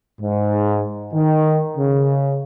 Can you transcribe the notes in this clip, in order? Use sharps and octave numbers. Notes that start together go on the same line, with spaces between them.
G#2
D#3
C#3